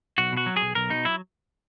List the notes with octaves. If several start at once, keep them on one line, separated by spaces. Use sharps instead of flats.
B1 F#4
B2 F#4
F#3
G#4
B1
B1 A#4
B2 D#4
F#3 E4